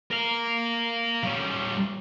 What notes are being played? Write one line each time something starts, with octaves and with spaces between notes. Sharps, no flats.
A#4 F5
G3 C#4